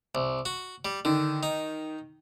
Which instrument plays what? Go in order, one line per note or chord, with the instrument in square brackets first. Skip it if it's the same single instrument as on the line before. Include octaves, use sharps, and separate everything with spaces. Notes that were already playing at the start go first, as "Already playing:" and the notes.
[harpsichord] C2
F#4
G3
[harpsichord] D3 [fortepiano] D#3
[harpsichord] D#4